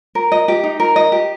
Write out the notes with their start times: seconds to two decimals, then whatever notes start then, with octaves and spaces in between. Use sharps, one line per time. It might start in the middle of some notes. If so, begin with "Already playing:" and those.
0.15 A#4
0.32 D#5
0.48 G4
0.63 D#4
0.80 A#4
0.96 D#5
1.12 G4